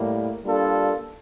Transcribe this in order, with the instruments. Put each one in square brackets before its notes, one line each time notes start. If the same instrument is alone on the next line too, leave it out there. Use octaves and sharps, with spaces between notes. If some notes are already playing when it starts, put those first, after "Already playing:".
Already playing: [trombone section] A2 G3 A#3
G3 A#3 D4 F4 A4